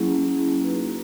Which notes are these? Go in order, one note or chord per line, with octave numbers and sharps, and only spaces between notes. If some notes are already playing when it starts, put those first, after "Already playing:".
Already playing: F#3 A#3 C#4 E4 G#4
A#3 D#4 F#4 B4